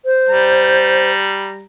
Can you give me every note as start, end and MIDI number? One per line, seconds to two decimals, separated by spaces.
0.05 1.11 72
0.29 1.65 55
0.29 1.65 82